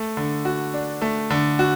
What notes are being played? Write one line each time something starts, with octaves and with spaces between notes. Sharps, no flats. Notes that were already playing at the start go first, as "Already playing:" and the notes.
Already playing: A3
D3
F#4
D4
A3
D3
F#4